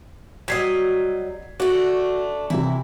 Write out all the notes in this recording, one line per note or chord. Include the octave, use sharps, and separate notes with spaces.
F#3 G3 D#5 G#6 B6 C7
A3 D4 F#4
C3 E3 E4